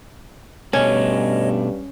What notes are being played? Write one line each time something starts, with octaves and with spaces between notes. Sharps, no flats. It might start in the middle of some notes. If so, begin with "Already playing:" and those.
G2 B2 A3 C#4 D4 C#5 D#5